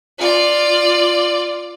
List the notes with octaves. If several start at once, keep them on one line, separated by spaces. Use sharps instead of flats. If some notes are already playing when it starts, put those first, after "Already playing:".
F4 D5